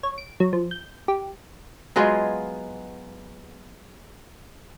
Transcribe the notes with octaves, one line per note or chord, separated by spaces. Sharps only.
C#5
D7
F#3
F3
G6
G4
F#3 G#3 B3 F4